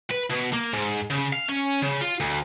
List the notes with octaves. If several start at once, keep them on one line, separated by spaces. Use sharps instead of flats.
B4
B2
A#3
G#2
C#3
F5
C#4
C#3
F4
D2